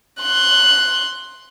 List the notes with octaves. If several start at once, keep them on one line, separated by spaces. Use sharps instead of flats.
C6 F#6